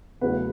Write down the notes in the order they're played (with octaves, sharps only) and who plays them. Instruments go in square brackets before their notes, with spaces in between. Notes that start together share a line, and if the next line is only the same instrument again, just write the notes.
[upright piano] E2 C#3 F#3 A3 B4